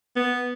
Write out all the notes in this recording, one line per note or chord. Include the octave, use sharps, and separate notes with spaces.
B3